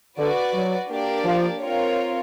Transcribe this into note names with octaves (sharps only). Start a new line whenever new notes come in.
D3 F#4 B4 D5
F#3
A#3 D4 G4 A#4 D5
F3
C4 F4 A#4 C#5